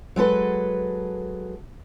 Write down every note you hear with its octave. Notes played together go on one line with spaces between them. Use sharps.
F#3 G#3 A4 B4